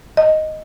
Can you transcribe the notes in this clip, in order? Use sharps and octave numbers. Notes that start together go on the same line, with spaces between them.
D#5